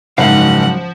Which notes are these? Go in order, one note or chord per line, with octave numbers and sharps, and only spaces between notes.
F#1 G#2 F3 F#3 F5 F#5